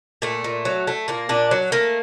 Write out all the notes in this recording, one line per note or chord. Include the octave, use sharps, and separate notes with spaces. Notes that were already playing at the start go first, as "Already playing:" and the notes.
A#2 A3
A#2
F#3
A3
A#2 A#3
A#2 D4
F#3
A3 A#3